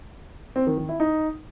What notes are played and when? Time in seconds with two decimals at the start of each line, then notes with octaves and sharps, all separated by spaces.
0.56 C4
0.67 D#3
0.78 D#3
0.89 E4
1.00 D#4